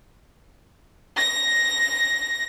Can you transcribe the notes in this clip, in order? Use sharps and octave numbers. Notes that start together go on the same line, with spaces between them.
A#6